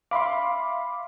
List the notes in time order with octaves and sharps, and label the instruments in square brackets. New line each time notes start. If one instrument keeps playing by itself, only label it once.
[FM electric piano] E5 B5 D6 [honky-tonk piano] F5 C6